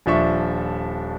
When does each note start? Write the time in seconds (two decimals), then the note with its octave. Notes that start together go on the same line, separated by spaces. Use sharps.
0.06 D#1 F3 D4 E5 C#6